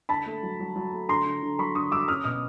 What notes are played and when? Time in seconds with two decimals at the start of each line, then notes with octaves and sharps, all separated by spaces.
0.09 D3 A5 B5
0.26 A3
0.43 F#3
0.60 F#3
0.76 F#3
0.92 A3
1.08 D3 A#5 C6
1.26 D3
1.42 D3
1.59 F#3 B5 C#6
1.75 D3 C#6 D#6
1.92 F#3 D6 E6
2.08 C#4 D#6 F6
2.24 B2 D#6 F6